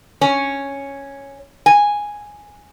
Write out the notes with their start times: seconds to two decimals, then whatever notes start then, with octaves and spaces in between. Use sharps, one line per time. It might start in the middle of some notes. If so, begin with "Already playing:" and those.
0.21 C#4
1.66 G#5